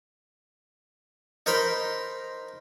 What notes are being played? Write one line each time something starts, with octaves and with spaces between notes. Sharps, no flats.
D#4 A#4 C5 B5 C6